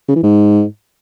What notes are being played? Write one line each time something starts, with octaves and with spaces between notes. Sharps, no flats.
C#3
E3
G#2